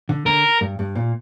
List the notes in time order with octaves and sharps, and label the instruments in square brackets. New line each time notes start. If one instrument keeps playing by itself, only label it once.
[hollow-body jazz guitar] D3
[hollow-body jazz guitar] D3 [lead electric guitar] A#4
[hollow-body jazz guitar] G2
G2
A#2